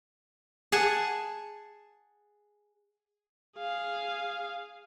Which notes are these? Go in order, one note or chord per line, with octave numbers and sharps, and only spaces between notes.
G#4 F#5 G#5 A5
G#4 F5